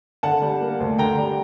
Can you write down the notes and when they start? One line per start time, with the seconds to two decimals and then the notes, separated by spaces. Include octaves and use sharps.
0.23 D3 F#5 A5
0.42 G3
0.61 A#3
0.80 D2
0.99 D3 G5 A#5
1.18 G3